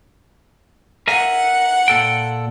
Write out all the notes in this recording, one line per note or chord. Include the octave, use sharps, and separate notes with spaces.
A#4 E5 F#5 G#5
A#2 A4 G5